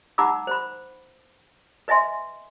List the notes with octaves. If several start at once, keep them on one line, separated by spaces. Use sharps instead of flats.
D#4 F#5 A#5 B5 D6 E6
C5 B5
B4 D#5 E5 G#5 C6